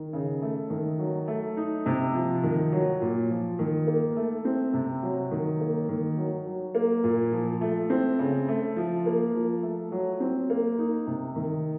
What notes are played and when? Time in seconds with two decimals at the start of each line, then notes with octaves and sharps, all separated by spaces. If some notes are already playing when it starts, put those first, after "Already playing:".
Already playing: D#3
0.13 C#3
0.42 A3
0.70 D#3
0.99 F#3
1.28 A3
1.57 D#4
1.86 C3
2.15 F3
2.43 D#3
2.72 F#3
3.01 A#2
3.30 F3
3.59 D#3
3.87 A#3
4.16 A3
4.45 C4
4.73 C3
5.03 F#3
5.31 D#3
5.60 A#3
5.89 D#3
6.17 F#3
6.46 F#3
6.75 A#3
7.04 A#2
7.32 F3
7.61 A3
7.90 C4
8.19 C#3
8.48 A3
8.76 F3
9.06 A#3
9.34 F3
9.63 A3
9.92 F#3
10.20 C4
10.50 A#3
10.78 D#4
11.07 C3
11.36 D#3